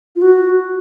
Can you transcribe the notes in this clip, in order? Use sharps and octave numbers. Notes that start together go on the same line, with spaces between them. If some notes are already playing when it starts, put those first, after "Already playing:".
F4
F#4